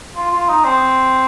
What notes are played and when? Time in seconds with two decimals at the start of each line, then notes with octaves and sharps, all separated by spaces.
0.16 F4
0.31 F4
0.48 D#4
0.65 C4